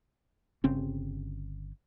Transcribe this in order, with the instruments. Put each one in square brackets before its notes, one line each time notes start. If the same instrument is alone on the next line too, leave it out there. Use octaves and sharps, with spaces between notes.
[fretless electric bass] G1 C#3 C4 C#4